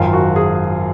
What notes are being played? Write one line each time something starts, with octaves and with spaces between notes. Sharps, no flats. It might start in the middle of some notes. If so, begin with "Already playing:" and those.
Already playing: G#1 F#2 D#3 F4
F#4
G#4